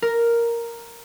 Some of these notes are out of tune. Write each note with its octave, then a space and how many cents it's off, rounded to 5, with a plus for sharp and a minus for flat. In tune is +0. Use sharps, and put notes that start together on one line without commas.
A#4 +0